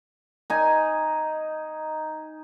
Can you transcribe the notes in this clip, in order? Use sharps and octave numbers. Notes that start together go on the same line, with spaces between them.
D#4 G#5